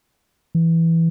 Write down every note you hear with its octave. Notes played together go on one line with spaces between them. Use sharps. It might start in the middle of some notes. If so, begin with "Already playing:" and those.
E3